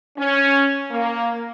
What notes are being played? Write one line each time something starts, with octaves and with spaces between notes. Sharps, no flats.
C#4
A#3